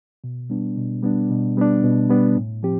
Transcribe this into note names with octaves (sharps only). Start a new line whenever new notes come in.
B2
G3 B3 D4
B2
G3 B3 D4
B2
G3 B3 D4
B2
G3 B3 D4
A2
F3 C4 G4